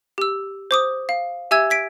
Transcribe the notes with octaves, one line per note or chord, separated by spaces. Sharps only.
G4 E6
C5 D6 D#6
F5
G4 E5 G#5 E6 G#6
G#6 B6 D7